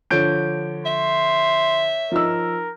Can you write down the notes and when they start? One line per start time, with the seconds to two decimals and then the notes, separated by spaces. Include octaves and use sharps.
0.11 D3 F3 C#5 G6 D7
0.86 E5 C6
2.12 F3 D#4 A#4 E6